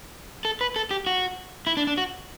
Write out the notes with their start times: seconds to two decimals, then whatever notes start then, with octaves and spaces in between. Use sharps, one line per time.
0.45 A4
0.61 B4
0.76 A4
0.91 G4
1.07 F#4
1.67 E4
1.77 D4
1.87 D4
1.98 F#4